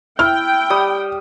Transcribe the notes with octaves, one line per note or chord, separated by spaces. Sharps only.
E4 G5 F6
G3 D#6